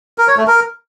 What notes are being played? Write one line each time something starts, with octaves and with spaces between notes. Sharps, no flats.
A#4
C#5
A3
A#4